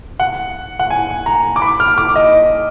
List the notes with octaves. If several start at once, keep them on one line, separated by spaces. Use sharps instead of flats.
F#5
F#5
G#5
A#5
D6
B5
F6
D6
D#5